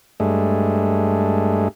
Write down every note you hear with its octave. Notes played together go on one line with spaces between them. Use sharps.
G2 G#3 A3